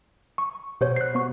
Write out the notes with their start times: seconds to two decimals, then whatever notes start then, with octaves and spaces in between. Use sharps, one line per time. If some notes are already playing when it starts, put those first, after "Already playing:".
0.38 C#6
0.81 B2 G4 C5 C#5
0.96 F#6 C7
1.15 B3 C#6